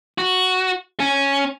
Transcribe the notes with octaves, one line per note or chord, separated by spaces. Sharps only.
F#4
C#4